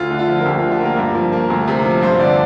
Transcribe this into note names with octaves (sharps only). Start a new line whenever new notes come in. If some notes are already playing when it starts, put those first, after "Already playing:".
Already playing: D2 F4
D3
F4
F3
A#4
D2 G4
D3 F4
F4
A#3 A#4
G2
F3
A#3
D2
C3
F3
G2 C5
D3 D5